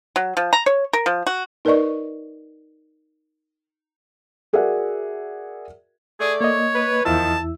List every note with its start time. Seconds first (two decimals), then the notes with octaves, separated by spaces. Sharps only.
0.16 F#3
0.37 F3
0.53 A#5
0.66 C#5
0.93 A#4
1.06 F3
1.27 F#4
1.65 D#4 A#4 B4 D5 D#5 C#6
4.53 F#4 G#4 A#4 D5 E5 F#5
6.20 A3 G#4 D5
6.41 A#3 C#5 D#5
6.75 B4
7.05 E2 D#3 F3 E4 A5 E6